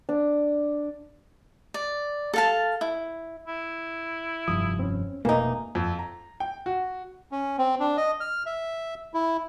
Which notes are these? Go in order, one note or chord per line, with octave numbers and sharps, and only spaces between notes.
D4
D5
A4 F5 A5
E4
E4
F1 G2 F3 D#6
C4 C#4
F1 B2 E3 A3 A#3 D#4
F2
A#5
G5
F#4
C#4
C4
D4
D#5
F6
E5
E4